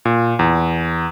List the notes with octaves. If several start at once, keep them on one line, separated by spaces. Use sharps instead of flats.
A#2
E2